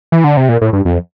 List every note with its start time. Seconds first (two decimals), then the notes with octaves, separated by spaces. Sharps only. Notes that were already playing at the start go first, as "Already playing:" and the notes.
0.12 E3
0.24 D3
0.37 C3
0.49 A#2
0.61 A2
0.73 G2
0.85 F2